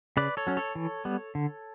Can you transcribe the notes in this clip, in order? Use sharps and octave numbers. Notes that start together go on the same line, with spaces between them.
C#3 B4 D5
A4 C#5
F#3 C#4
A4 C#5
E3
G3 B3
D3